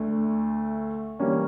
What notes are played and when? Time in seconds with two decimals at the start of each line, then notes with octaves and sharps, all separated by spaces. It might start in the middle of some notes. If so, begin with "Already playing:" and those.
Already playing: D2 D3 A3
1.20 E3 G3 A#3 C#4